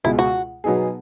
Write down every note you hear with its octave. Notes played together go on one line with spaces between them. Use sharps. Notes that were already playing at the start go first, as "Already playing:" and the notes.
C#2 B2 G#3 E4
F#4
B2 F#3 B3 D#4 G#4